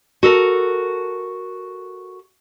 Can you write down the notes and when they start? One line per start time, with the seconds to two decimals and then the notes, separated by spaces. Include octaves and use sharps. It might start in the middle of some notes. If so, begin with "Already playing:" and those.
0.23 F#4 A4 A#4